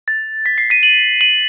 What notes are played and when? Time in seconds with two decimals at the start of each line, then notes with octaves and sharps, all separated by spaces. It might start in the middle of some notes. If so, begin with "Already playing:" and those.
0.08 A6
0.46 B6
0.58 C7
0.70 B6 D#7
0.83 D#7 F#7
1.21 D#7 F#7